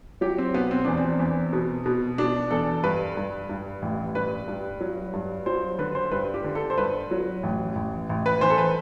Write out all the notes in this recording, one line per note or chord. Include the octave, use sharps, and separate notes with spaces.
F#3 G4
C4
B2 B3
C4
E2 D4
C4
E2
B2
B2
B2 D4
E2 A4
G2 B4
G2
G2
A1
G2 B4
G2
F#3
G2
F#3 C5
D3 B4
C5
G2 B4
G4
D3
A4
C5
G2 B4
F#3
A1
A1
A1
B4
E3 C5
A4
B4